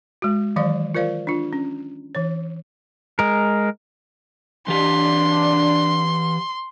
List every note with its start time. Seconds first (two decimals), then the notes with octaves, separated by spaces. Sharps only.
0.22 G#3 F#4
0.56 D#3 E3 F#3 D5 F5
0.95 F4 A#4 C5 D5 F5
1.27 D4 F4
1.53 C#4
2.15 E3 C#5
3.19 G#3 A#4
4.68 E3 D4 G4 C6